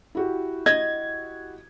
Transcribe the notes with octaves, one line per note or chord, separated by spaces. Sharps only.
E4 F#4 G4
D#5 G#6